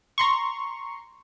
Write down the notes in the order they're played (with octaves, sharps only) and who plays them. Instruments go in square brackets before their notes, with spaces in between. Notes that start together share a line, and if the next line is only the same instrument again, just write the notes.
[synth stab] A#5 C6 C#6